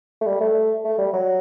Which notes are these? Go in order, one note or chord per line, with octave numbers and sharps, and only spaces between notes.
A3
G3
A3
A3
G3
F#3